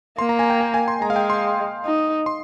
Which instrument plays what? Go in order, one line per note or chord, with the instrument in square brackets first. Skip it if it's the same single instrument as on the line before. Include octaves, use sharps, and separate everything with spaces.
[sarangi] A#3 [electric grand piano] C6
[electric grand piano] A#5
G#5
G5
G#5
G#5
C6
[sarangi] G#3 [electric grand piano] A#5
[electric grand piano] F5
G5
C6
[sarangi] D#4
[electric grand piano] C6